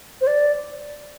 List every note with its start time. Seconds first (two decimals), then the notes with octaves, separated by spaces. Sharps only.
0.21 C5
0.27 D5